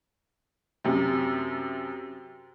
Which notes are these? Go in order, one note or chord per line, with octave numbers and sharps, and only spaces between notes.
F#2 C3